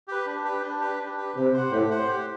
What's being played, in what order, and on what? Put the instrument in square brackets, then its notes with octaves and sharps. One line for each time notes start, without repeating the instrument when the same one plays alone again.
[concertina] G4 B4
D4
G4 B4
D4
G4 B4
D4
G4 B4
[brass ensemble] C3 [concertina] G4
[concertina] C5 F#5
[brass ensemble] A2 [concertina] G4
[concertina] C5 F#5
G4